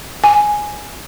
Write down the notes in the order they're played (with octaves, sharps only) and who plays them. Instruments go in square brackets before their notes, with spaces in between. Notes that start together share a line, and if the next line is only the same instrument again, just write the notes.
[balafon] G#5